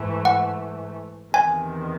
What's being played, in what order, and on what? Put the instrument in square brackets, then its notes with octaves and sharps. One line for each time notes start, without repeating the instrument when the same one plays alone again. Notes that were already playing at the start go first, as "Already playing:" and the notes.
Already playing: [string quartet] G#2 E3 A3
[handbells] F#5
[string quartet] E2 C3 D#3 [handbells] G#5